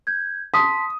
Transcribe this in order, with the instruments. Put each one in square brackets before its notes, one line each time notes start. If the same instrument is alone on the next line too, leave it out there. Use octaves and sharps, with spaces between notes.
[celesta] G6 G#6
[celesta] A5 C6 B6 [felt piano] D#6